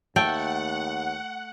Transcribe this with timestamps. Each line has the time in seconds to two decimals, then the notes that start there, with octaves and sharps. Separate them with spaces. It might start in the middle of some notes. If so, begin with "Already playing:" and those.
0.16 D#2 A3 F#5 G5